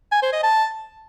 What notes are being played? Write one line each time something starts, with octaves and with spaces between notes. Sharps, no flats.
G#5
C5
D#5
A5